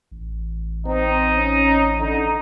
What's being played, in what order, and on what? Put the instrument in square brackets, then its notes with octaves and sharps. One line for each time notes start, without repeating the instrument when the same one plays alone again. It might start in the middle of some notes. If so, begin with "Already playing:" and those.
[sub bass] A1
[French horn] C4 [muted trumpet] D#4
[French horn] C#4
[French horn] D3 [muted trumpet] D#4